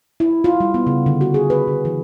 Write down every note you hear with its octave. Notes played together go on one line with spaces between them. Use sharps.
E4
F4
G3
B3
C#3
D3
F#4
G#4
B4
D3
E3